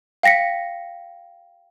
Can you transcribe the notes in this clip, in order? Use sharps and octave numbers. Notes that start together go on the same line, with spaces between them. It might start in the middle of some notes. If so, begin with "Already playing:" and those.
F5 G5 A#6 B6 C#7